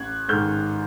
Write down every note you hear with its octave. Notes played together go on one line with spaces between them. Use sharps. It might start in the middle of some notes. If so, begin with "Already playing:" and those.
Already playing: A1 F#6 G#6
G#2 D#3 F6 G6